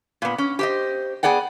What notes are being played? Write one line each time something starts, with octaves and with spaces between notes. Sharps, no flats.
A#2 B3
C#4
G4 C5 D#5
B3 G#4 D5 F#5 G5